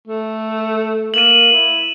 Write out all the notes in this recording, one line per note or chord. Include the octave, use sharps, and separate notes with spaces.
A3
A#3 D#7 E7 F#7
E4